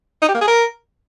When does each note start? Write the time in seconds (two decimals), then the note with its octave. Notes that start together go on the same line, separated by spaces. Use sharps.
0.22 D#4
0.28 G4
0.35 A#3
0.41 G#4
0.47 A#4